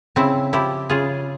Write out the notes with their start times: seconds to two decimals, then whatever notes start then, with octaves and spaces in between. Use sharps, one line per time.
0.16 C#3 C4 E4
0.53 F3 E4 G4
0.90 C#3 F4 G#4